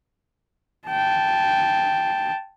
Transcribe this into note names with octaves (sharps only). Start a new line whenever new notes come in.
G5 A5